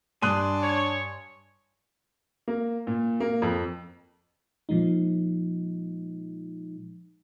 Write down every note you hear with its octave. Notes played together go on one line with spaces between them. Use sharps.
G2 D4 G#5 C6 D#6 F#6 D#7
C#5
A#3
A#2
A#3
F2
A#2 F3 G#3 D#4